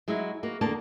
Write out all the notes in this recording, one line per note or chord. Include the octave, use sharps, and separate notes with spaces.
F#3 G#3 D#4 E4
A#3 F#4
E2 D3 A#3 A5